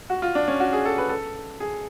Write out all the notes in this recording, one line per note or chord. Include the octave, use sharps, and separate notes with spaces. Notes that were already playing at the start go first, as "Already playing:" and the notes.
F#4
F4
D4
C#4
F#4
G#4
A4
B4
A4
G#4